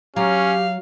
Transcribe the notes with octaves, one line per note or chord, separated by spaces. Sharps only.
F#3 C#4 G4 F5